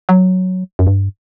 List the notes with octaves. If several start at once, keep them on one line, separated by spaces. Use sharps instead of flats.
F#3
F#2
G2